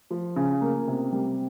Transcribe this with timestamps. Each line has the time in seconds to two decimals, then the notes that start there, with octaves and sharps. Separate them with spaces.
0.11 F3
0.36 C#3
0.61 A#3
0.87 C3
1.12 G3